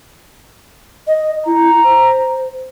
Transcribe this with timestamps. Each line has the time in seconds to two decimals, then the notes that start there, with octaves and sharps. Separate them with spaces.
1.07 D#5
1.46 E4 A#5
1.84 C5